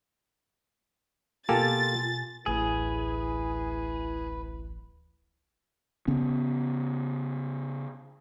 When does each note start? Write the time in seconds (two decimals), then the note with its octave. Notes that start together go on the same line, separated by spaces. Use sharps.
1.49 B2 A#3 F4 G4 A4 G#5 A6
2.46 D1 A1 E4 G#4 B4
6.07 C#3 B3 C#4